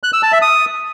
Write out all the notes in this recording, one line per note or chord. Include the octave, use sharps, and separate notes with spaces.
F#6
E6
A5
E5
D#6